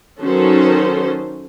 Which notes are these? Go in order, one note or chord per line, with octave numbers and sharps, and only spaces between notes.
D#3 F#3 C#4 A4 C5